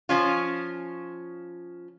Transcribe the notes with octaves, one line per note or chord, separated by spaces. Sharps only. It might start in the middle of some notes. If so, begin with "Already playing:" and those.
F3 C#4 F4